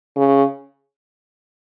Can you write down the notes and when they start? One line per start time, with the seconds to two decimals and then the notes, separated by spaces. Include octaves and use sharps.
0.16 C#3